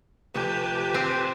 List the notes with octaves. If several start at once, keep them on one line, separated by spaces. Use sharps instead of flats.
D2 C3 F3 G4 B4 G#5 A5
C4